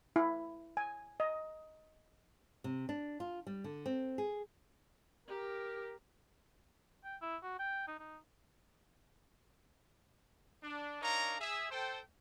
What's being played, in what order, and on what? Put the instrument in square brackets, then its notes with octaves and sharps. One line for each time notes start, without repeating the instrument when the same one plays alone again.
[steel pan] E4
G#5
D#5
[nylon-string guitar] C3
D4
F4
G3
D3
C4
G#4
[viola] G4 [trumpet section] A#4
[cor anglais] G5
E4
F#4
G5
D#4
D#4
[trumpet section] D4
D4 D#4 A#4 C#5 F5 A#5
G#4 E5
A4 C5 G5